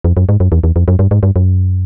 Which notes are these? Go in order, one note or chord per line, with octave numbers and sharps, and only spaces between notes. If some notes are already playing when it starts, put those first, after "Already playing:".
F2
F#2
G#2
F#2
E2
E2
F2
F#2
G2
G#2
G2
F#2